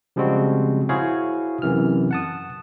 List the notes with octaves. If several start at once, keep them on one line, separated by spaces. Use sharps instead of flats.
C#3 F3 G3 G#3 C4 F#4
E4 F#4 G#4 C5 C#5 F5
F#2 C3 E3 F6
F#5 A5 D#6